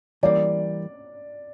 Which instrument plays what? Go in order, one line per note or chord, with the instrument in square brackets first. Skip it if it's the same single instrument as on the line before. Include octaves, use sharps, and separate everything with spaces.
[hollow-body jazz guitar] E3 G3 A#3 [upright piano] D5